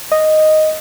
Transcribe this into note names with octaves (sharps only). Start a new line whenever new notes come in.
D#5